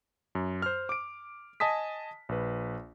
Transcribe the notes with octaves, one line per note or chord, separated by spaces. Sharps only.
F#2
C5 F6
D6 D7
D#5 G#5 A5 D#6 B6
A#1 B4